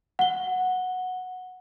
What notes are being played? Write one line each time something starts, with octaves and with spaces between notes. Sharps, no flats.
F#5 G7